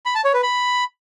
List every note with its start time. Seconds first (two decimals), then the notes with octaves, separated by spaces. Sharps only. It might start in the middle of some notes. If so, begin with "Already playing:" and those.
0.06 B5
0.15 A5
0.24 C#5
0.34 B4
0.43 B5